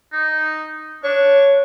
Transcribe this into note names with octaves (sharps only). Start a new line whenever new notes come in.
D#4
D4 C#5